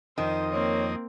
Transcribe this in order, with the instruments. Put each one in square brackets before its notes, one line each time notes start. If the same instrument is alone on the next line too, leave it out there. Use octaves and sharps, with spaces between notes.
[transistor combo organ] F2 D#5 [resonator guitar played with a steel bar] D#3 [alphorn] D#4 [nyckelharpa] C5
[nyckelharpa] A#3 C4 [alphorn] C#5